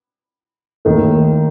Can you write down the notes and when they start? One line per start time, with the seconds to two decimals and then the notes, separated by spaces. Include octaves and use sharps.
0.85 D#2 D#3 A3